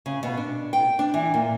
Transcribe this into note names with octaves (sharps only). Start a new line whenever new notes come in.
C#3
B2
D4
G5
D4
E3
A#2